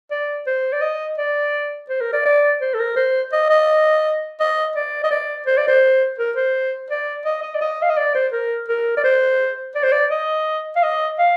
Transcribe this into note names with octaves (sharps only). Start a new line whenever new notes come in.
D5
C5
D5
D#5
D5
C5
A#4
D5
D5
C5
A4
A#4
C5
D#5
D#5
D#5
D5
D#5
D5
C5
D5
C5
A#4
C5
D5
D#5
D#5
D5
D#5
F5
D#5
D5
C5
A#4
A#4
D5
C5
D5
C5
D5
D#5
F5
D#5
F5